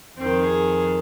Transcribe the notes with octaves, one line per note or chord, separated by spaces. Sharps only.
F2 D#3 C4
G#4